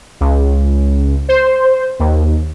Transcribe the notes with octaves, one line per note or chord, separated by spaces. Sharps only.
C#2
C5
D#2